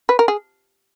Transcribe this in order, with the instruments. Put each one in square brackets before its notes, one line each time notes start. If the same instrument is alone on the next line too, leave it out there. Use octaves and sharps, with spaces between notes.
[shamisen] B4
A#4
G#4